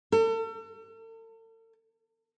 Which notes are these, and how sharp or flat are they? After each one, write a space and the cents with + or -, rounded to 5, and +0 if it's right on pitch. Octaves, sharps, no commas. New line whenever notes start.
A4 +40